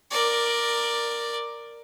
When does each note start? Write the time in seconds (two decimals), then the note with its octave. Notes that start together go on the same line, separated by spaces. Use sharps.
0.11 A#4 D5